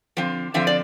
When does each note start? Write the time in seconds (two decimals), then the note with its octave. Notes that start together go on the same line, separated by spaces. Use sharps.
0.17 D3 F3 C4
0.54 D3 F3 C4 E5
0.67 D5